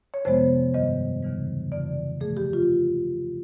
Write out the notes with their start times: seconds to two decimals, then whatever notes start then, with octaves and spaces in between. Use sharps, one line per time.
0.14 C#5
0.25 F2 C3 F3 G#3 B3 C5
0.74 G2 D#3 G3 D#5
1.23 D#2 C#3 E3 G3
1.72 F2 C#3 E3 D5
2.21 A#2 F3 A3 G#4
2.37 G4
2.53 F4